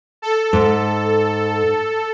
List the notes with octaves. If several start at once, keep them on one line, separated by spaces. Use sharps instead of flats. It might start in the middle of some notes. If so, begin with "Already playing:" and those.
A4
G#2